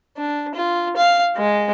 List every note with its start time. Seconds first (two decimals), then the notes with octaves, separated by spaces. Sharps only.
0.17 D4
0.55 F4
0.96 F5
1.36 G#3